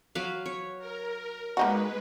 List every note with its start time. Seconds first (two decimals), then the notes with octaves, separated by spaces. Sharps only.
0.15 F#3 B4 F5
0.46 C#5
0.78 A#4
1.57 G#3 A#3 D#4 F#4 B4